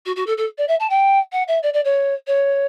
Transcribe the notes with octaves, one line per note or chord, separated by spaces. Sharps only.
F#4
F#4
A4
A4
D5
E5
A5
G5
F#5
E5
D5
D5
C#5
C#5